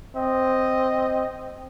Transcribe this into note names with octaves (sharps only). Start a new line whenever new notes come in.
C4 D#5